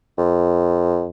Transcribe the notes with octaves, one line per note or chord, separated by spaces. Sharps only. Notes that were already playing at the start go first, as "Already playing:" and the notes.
F2